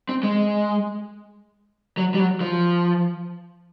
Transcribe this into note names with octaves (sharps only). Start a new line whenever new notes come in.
C4
G#3
F#3
G3
F#3
F3